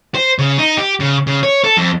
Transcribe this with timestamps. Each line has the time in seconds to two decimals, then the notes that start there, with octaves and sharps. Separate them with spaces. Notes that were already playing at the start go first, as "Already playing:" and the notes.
0.15 C5
0.39 C#3
0.58 D#4
0.77 G4
1.00 C#3
1.27 C#3
1.44 C#5
1.64 A4
1.77 F2